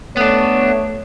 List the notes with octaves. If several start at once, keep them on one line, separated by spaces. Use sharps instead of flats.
A3 B3 D4 C#5